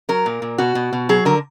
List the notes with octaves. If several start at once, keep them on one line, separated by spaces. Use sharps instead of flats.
F#3 A#4
A#2
A#2
B2 F#4
B2
B2
F#3 G#4
D3 A#4